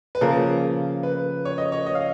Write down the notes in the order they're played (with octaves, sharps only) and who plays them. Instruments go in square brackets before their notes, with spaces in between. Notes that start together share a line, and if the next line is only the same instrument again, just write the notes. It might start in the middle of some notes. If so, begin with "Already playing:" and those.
[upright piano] B4
[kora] C#3 F3 A#3 [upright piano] A#4
[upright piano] B4
C#5
D#5
C#5
D#5
F5